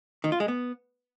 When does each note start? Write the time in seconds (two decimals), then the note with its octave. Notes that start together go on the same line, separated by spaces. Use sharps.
0.24 D#3
0.32 F4
0.40 G#3
0.48 B3